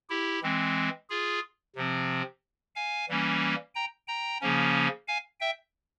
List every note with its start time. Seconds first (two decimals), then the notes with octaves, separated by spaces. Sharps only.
0.10 E4 G4
0.43 E3 G#3 C4
1.10 F4 G#4
1.76 C3 F3 C4
2.75 F5 G#5
3.09 E3 G3 A#3 C#4
3.75 G5 A#5
4.08 G5 A#5
4.41 C#3 F3 A#3 C#4
5.08 F5 G#5
5.40 E5 G5